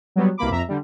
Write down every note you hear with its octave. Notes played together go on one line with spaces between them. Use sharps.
F#3 G3 B3
C2 B2 A#3 B5 D6
F2 E5 A#5
D3 G3